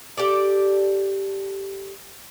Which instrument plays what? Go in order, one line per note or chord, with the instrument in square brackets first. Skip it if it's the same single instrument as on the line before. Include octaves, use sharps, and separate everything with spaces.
[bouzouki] G4 A4 D5